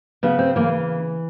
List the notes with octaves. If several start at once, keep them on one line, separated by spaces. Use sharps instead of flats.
C#3 B3
C4
E3 A#3